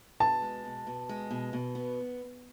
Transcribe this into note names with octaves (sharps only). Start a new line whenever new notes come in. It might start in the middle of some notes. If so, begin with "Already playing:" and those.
B2 A5
G#3
B2
B2
G#3
B2
B2
B3